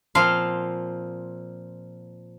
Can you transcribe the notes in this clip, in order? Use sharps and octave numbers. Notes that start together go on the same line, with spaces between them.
A#2 F3 C4 C5 F5